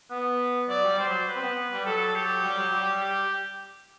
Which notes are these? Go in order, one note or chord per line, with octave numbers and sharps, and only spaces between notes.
B3
F#3 D5
G3
G3 C5
F#3
B4
C4
B3
G3
F#3 A4
G4
G3
F#3
G3
G4